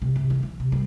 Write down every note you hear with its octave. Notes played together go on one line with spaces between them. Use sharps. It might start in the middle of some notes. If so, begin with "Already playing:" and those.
C3
C3
E3
E3
C3
G3